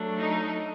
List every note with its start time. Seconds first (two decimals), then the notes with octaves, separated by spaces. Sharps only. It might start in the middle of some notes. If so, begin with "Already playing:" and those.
Already playing: F#3 A3 D4
0.19 D#4